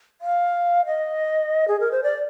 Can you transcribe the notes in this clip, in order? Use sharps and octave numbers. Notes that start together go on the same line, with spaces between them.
F5
D#5
G#4
A#4
C5
D5